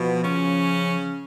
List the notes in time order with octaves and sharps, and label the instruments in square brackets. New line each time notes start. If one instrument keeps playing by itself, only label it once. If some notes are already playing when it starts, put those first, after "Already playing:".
Already playing: [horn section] B2 B3 [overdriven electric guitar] F3
[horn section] C#3 C#4